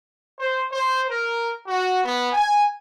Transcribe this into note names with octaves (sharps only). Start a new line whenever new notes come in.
C5
C5
A#4
F#4
B3
G#5